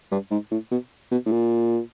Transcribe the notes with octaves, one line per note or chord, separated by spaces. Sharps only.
G2
G#2
A2
B2
B2
A2
A#2